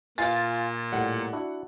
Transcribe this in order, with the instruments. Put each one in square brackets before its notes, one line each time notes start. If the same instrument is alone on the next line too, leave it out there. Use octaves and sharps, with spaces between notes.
[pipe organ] A#2 [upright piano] F4 G#5 A6
[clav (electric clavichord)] A2 G3 [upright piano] F#5
[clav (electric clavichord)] D4 E4 F#4